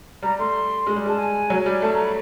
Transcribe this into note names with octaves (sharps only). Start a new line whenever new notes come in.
G3 A#5
A3 C6
G#3
G3
G#3 A5
G#5
F#3
G3
A3 A5
A#5
B5